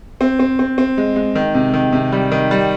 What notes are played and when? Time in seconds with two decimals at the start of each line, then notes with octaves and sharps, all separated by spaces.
0.21 C4
0.39 C4
0.59 C4
0.78 C4
0.98 G#3
1.16 G#3
1.35 D#3
1.54 C3
1.74 D#3
1.93 C3
2.12 G3
2.32 D#3
2.51 G3